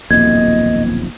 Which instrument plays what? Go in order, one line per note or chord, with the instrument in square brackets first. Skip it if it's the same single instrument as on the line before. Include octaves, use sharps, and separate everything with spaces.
[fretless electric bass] D#1 B1 F2 [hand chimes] A#3 [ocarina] D#5 [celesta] G#6